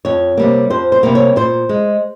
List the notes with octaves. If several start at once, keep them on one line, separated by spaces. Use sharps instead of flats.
F2 C#5
C3 G3 A#3
F2 C5
C5
C3 G3 A#3
C#5
A#2 C5
G#3